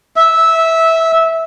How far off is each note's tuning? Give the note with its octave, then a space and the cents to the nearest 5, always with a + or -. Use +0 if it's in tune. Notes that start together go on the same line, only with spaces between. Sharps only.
E5 -15